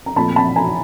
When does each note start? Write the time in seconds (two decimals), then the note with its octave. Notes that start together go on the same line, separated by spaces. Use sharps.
0.06 A#5
0.16 A#2 F3 A3 C4 A5 B5
0.36 A5 B5
0.56 G#5 A#5